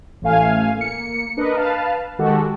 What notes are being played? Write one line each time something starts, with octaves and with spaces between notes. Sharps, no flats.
A1 A2 A3 F5 G#5
A#3 C#7
D4 A#4 B4 D#5
B4 F5 A5
D#3 G#3 F#4 G4 A4